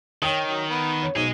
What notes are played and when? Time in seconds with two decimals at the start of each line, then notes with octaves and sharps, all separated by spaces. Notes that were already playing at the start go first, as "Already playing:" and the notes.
0.22 D#3 C#5 G5 D#6
0.50 F#3
0.70 B3
1.02 C#5
1.16 B1 G#2 G#4 D#5